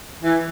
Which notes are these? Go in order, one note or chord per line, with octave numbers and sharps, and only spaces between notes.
E3